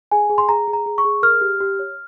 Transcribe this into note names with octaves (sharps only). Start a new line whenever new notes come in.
G#4 G#5
G#4
C6
G#4 A#5
G#4
A#5
G#4
C#6
G#4
A#4 F6
G4
G4
C#5